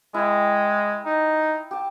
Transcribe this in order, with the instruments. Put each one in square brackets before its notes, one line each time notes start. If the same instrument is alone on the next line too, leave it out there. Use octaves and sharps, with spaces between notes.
[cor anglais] G#3 [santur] E4 G5
[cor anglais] D#4
[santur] G4 A5